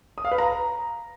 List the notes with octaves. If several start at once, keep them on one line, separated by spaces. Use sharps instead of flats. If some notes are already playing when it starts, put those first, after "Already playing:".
D#6
F5
B4
A#5